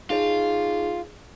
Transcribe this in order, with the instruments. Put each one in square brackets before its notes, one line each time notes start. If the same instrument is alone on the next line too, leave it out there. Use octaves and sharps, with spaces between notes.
[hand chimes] D#4 G#4 C#5 [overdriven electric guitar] F4